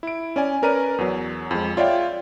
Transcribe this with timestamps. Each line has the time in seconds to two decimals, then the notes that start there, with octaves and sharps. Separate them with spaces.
0.03 E4 D7
0.36 C#4 D5 G#5
0.62 C#4 A#4 B4 D5 A#5 D#7
0.98 E2 F#3
1.51 F2 G#3
1.77 F4 C#5 D5 E5 F5 G5